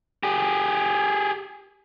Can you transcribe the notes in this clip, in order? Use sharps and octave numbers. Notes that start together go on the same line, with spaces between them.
G4 G#4